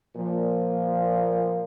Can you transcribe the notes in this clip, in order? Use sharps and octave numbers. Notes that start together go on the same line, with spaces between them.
A#2 F3